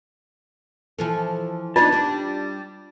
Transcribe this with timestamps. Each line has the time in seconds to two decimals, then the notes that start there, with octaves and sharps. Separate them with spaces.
0.99 E3 F3 A4
1.76 B3 D4 D#4 F4 D5 A5
1.93 G3 D4